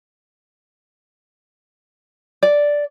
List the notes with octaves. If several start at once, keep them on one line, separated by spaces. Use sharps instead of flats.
D5